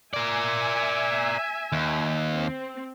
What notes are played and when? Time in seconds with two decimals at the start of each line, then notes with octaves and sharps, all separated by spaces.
0.14 A#4 D5 E5 G#5
1.72 D#2
2.34 C4